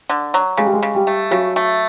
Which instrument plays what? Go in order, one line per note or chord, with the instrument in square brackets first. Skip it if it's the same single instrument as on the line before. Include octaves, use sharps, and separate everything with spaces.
[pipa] D3
F#3
[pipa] C#3 [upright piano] G#3
[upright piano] G3
G#3
[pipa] C#3
[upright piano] G3
[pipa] A3
[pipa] C#3 [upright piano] F#3
[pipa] A3